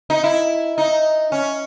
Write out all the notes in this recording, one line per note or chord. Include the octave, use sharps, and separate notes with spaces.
D#4
E4
D#4
C#4